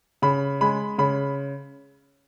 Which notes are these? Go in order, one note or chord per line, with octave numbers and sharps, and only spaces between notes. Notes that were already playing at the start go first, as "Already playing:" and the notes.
C#3 B5
G#3 B5
C#3 B5